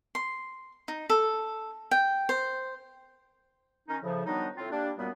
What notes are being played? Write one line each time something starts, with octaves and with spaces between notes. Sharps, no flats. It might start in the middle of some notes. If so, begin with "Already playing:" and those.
C6
D#4
A4
G5
C5
D#3 C#4 D#4
A2 C#3 F3
D#3 F#3 G3 B3 D4 D#4
A2 C4 F4
G3 A#3 D4
F#2 A#2 G3 B3